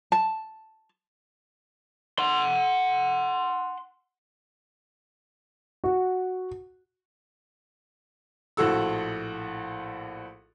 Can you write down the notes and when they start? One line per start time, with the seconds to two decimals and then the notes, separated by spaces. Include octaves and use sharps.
0.12 A5
2.19 F#5 C6
5.84 F#4
8.57 A#1 A2 F#4 A4 E6